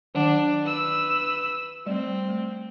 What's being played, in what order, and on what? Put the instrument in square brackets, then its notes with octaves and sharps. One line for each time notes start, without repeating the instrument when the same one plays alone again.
[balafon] D#3 F#3 F#5 [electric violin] D4
[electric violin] B4 E6
[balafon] G3 A3 D5 [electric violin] C4
[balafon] A3